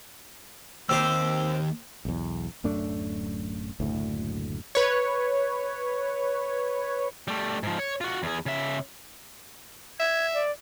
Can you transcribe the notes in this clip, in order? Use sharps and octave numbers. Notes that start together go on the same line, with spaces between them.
D#2 C4 G4 C5 E6
B1 E2
D1 F#2 A3 D4
F#1 D2 A2
B4 C#5
G3 A3
G#2 F3
C#5
F4 F#4
E2 G#4
C#3 E5
E5 G#6
D5